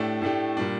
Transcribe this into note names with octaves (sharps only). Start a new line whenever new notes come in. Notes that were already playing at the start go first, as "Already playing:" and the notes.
Already playing: A2 A3 D4 G4
A2 A3 D4 G4
A#2 G3 D4